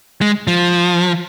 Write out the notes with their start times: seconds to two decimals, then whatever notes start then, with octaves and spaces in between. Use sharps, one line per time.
0.21 G#3
0.47 F3